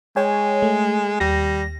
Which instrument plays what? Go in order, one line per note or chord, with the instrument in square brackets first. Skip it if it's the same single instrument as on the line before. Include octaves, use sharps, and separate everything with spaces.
[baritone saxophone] G#3 [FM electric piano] C#5 G5 G#5
[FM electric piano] A3
[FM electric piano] D#2 A#6 [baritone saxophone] G3